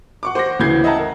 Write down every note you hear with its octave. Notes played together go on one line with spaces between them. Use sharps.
F#5 C#6 D6
C5 F#5 D6 A#6
D2 C#3 E3 G6 G#6 C7
D#5 E5 F#5 G5 A5 A#5
A#4